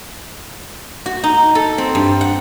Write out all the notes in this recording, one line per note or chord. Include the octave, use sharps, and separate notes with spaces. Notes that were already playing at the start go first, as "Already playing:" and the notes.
F#4
D#4
A4
C4
G2
F#5